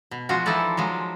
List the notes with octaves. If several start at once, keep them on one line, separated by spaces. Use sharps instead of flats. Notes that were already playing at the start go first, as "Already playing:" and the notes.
B2
F3 G#3 F4 F#4
E3 F3 D#4 E4 A4 D5
F3 F#3 G#3